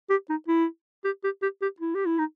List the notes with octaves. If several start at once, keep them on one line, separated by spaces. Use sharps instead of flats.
G4
D#4
E4
G4
G4
G4
G4
E4
G4
E4
D#4